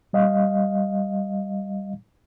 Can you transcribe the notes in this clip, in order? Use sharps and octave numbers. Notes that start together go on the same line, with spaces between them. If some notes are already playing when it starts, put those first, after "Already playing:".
G3 D#5 F5